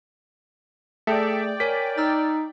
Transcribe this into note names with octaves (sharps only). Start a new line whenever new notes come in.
A3 G#4 A4 D5 E5 G5
A#4 C#5 G#5 B6
D#4 E6 F6 A6